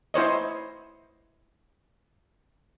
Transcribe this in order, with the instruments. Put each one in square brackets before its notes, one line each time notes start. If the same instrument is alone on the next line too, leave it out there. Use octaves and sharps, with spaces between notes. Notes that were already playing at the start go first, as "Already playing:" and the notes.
[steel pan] E4 C5 C#5 D#5